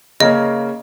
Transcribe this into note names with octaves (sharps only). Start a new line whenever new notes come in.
C#3 A#3 C#4 D#5